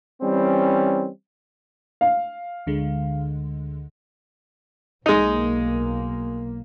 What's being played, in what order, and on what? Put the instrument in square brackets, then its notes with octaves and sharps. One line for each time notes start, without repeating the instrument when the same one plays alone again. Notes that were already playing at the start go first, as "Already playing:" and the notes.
[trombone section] E3 G3 C4 C#4
[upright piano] F5
[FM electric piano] D2 D3 G#3
[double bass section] B1 A#3 [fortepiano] G#3 D#4